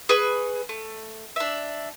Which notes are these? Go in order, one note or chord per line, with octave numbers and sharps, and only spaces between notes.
G#4 B4 C#6
A3
D4 E5